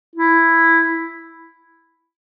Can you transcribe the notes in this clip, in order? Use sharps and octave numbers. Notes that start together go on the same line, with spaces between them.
E4